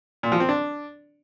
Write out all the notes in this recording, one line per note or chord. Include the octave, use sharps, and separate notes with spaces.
A#2
F3
C4
D4